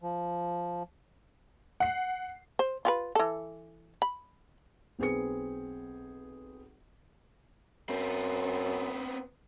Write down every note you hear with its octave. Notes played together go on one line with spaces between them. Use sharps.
F3
F#5 C7
C5
F4 G#4 B4
E3 A4
B5
B1 C4 G#4 B4 C#7
F#2 B3 C4